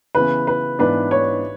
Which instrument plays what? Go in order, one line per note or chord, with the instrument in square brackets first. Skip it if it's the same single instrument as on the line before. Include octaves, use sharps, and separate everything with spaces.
[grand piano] C#3 E3 B3 [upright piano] B4
[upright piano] B4
[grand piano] G#2 E3 B3 D4 [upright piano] B4
[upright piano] C#5